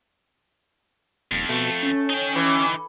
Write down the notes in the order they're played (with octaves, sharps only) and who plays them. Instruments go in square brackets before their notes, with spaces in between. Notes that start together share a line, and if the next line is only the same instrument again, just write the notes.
[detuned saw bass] D#1 [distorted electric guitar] F2
[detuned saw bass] B2 [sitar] A3
[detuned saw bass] C#4
[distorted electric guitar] D#4 G5
[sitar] E3